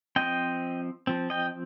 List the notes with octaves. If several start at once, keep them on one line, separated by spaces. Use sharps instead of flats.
F3 C4 D#5 G5
F3 C4
D#5 G5